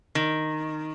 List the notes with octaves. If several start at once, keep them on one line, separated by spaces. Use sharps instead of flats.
D#3